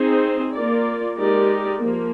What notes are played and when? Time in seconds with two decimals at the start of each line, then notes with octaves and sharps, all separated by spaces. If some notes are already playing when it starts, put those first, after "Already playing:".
Already playing: C4 D#4 G#4 C5
0.53 A#3 F4 A#4 D5
1.17 G#3 D#4 G4 A#4 D5
1.81 F3 A#3